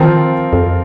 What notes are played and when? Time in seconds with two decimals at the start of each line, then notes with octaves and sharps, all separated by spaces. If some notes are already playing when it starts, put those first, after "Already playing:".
Already playing: D#3 F3 C4 F4 A#4
0.53 F2